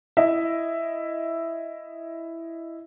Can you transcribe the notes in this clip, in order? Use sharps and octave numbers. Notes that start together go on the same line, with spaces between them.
E4 D#5 E5